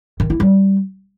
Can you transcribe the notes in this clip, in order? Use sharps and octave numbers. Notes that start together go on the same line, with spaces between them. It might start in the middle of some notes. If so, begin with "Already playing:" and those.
D#3
E4
G3